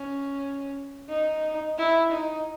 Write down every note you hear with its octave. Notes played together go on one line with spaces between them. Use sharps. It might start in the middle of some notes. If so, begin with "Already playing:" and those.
Already playing: C#4
D#4
E4
D#4